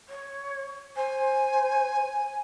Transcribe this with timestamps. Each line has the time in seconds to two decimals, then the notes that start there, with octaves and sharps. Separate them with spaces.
0.09 C#5
0.96 C5 G#5